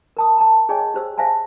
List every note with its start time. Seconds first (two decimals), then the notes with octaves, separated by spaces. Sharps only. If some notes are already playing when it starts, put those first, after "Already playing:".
0.17 A#4 A5 D#6
0.38 A5 A#5
0.69 G#4 C#5 D#5 G5 G#5 C#6
0.94 G4 C5 E6
1.17 C5 E5 F5 G#5 A5